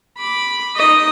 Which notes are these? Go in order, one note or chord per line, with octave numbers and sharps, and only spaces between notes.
B5 D6
D#4 D#5